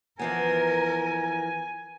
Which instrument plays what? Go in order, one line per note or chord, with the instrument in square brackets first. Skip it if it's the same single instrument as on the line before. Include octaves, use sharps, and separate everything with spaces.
[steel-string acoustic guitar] E3 F3 B3 [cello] A#4 [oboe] G#5